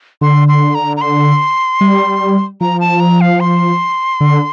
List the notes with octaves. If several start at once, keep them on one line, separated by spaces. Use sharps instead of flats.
D3 C6
C6
A#5
A#5
C6
G3
F3 A#5
A5
A#5
F5
C6
D3